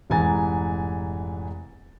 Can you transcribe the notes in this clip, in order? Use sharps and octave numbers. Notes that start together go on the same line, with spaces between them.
F1 G#2 E3 G#5 A#5 A6